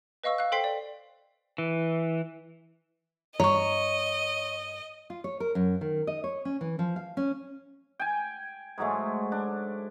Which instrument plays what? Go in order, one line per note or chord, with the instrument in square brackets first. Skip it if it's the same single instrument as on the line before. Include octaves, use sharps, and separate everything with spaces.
[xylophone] B4 D#5 F5 C#6 E6
F5 F#6
A4 C5 G5 C6 B6 C7
D5
[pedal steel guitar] E3
[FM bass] G2 [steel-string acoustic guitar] C#5 [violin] D#5 [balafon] A#5 C#6
[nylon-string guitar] F4
C#5
A#4
F#2
D#3
D#5
C#5
C#4
E3
F3
F5
C#4
[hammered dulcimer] G5 G#5
G#2 F#3 G#3 A3
D4